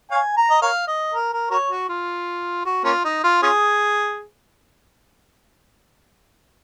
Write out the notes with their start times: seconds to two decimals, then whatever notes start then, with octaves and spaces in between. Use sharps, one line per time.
0.11 C#5 F5 G#5
0.37 A#5
0.50 D#5
0.62 A#4 C#5 F5
0.88 D#5
1.14 A#4
1.33 A#4
1.51 F#4 A#4 C#5
1.71 F#4
1.89 F4
2.65 F#4
2.84 A#3 C#4 F4
3.04 D#4
3.24 F4
3.42 C#4 F4 G#4